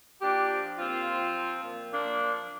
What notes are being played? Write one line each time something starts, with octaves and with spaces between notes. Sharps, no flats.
A#2 D4 G4
F3
A#2 C4 F4
F3
F3
A#2
F3 A#3 D4
F3